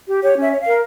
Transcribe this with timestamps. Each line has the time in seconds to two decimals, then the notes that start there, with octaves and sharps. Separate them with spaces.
0.08 G4
0.22 G4 C#5
0.37 C#4 E5
0.51 C#5
0.61 F5
0.66 A#4